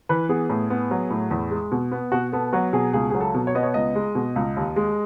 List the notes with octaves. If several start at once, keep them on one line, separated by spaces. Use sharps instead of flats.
E3 B4
B3 G#4
A2
B3
F#3
A2
E2
G#3
B2
B3
B2 F#4
B3 A4
F#3 F#4
B2 G#4
C#2 G#4
F#3 G#4
A4
B2
C#5
B3 D#5
C#5
C#2 D#5
G#3
B2
C#2
D#2
G#3